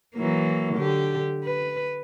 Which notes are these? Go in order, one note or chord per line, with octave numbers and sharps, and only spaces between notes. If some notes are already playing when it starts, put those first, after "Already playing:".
E3 F#3 A#3
D3 G4
B4